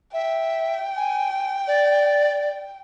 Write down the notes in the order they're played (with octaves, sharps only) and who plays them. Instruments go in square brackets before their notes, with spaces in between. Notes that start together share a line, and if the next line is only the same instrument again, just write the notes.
[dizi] E5 [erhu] G5
[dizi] G#5
D5